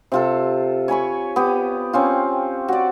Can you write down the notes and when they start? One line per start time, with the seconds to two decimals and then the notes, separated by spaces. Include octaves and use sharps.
0.12 C3 F4 A4
0.88 C#5 G#5 B5 C#6
1.36 B3 G4
1.93 C4 C#4 F4
2.68 F#4 D5